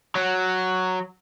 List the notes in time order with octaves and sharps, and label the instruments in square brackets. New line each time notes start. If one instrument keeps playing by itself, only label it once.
[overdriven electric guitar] F#3